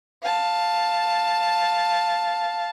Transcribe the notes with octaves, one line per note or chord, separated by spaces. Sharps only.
F5 A5